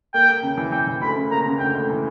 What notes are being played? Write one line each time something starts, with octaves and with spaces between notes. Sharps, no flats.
A#3 G5
A#3
C#3
E3
E3 G5
E3
D2 B5
C#3
A#3 A#5
C#3
D2 G5
D2
E3